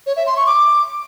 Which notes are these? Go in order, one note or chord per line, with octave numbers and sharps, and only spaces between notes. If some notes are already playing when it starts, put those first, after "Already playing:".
C#5
E5
C6
C#6
D6